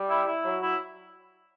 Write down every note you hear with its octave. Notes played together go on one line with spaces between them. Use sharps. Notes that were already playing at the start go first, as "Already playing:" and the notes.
Already playing: G3
E4
E4
F#3
E4